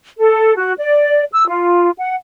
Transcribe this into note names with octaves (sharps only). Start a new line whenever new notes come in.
A4
F#4
D5
E6
F4
F#5